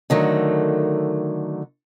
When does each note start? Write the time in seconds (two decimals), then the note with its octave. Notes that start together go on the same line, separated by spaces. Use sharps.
0.10 D3 D#3 F#3 A3